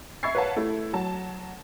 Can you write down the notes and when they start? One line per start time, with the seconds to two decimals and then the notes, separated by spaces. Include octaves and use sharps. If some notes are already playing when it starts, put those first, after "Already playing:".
0.23 E5 B5 C#6 G#6 A6 C7
0.35 B4 C#5 F5 F#5 A5
0.56 A3 E4
0.93 F#3 A5